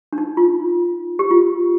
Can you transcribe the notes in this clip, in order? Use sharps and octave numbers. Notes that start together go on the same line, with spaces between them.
D4
D#4
F4
G4
F4